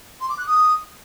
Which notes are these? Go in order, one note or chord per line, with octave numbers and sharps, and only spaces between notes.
C6
D6
F#6
D#6